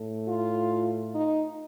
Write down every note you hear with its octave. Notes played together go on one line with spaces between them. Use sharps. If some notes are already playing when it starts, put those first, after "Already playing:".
Already playing: A2 A3
F4
D#4